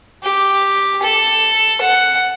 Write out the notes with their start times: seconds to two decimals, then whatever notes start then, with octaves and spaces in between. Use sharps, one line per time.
0.23 G4
1.03 A4
1.81 F#5